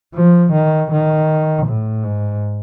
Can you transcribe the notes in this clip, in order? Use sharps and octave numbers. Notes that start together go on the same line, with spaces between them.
F3
D#3
D#3
A2
G#2